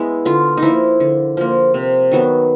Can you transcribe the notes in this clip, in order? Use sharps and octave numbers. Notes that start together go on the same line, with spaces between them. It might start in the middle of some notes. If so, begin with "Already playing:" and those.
Already playing: G#3 B3 E4
D3 F4
D#4
F3 A#3 E4
D3
F3 A#3
C3
D#3 F#3 B3